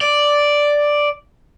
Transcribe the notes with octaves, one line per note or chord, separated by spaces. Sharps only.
D5